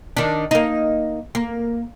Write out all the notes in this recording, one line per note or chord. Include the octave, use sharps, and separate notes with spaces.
D#3 D4
A#3 D#4
A#3